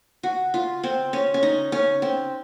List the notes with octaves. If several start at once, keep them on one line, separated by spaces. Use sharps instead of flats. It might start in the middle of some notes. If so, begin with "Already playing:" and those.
F#4
F4
C4
C#4
C#4
D#4
C#4
C4